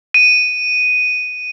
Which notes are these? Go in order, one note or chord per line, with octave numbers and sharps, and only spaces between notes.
D#7